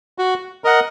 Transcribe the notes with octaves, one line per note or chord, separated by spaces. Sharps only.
F#4
A#4 D#5 F#5